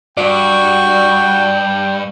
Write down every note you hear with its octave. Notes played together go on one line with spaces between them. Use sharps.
G2 F#4 D5 G5